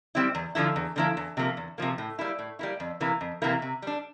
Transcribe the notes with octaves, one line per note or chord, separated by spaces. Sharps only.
G3 C4 E4
E2
D3 F3 A#3 E4
E2
D3 F3 A#3 E4
E2
C3 F3 A#3
E2
C3 F3 A#3
A2
G3 A#3 E4
A2
G3 A#3 E4
F2
C3 E3 A#3 E4
F2
C3 E3 A#3 E4
C3
G3 D4